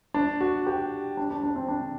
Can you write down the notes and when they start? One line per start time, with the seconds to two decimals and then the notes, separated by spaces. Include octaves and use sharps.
0.14 D4
0.40 F#4
0.67 G4
1.17 D4
1.31 D4
1.43 D4
1.55 C4
1.68 D4